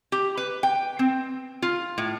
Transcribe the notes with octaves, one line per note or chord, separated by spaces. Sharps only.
G4
B4
G5
C4
F4
A2